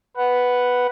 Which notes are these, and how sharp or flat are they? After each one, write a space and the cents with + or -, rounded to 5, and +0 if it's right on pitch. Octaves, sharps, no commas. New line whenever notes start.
B4 +0 F#5 +0